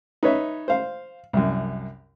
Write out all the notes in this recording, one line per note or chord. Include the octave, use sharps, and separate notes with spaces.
D#4 B4 C#5 E5
C5 F5
C2 F#2